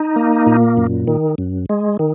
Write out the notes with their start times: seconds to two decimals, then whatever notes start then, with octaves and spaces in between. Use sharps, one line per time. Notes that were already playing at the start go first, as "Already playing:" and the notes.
Already playing: D#4
0.16 A#3
0.46 A#2
0.77 F#2
1.07 D#3
1.38 F#2
1.69 G#3
1.99 D#3